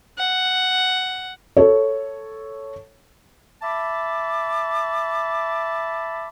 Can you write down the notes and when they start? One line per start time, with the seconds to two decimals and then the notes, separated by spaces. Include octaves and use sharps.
0.18 F#5
1.57 A4 C#5
3.62 E5 A5 B5 D6